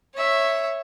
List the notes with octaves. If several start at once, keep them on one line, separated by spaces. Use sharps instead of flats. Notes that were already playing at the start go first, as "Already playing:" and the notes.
C#5 E5